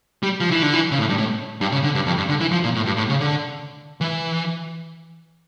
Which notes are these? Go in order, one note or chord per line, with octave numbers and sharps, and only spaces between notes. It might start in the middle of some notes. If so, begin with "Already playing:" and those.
G3
F3
E3
D3
E3
C#3
A2
G2
A2
G2
C#3
D3
G2
F2
G2
D3
E3
F3
A#2
A2
G2
A2
C#3
D3
E3